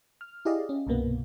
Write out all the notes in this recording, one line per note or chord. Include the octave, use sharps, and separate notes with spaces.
F6
E4 G4 G#4 D5 D#5 F5
C#4
C2 G2 B2 A#3 B3